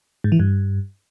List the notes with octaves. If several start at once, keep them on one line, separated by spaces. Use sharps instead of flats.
G#2
E3
G2